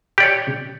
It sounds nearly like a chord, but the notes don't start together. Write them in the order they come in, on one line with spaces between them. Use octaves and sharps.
G4 D5 C#5